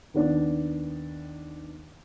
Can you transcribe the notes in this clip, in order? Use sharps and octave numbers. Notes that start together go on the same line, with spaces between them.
D#2 B3 D4